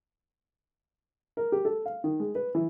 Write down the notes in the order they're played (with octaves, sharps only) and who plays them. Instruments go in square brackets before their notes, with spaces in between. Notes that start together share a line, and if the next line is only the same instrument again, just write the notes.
[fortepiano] A#4
G4
A4
F5
D#3
G#3
B4
E3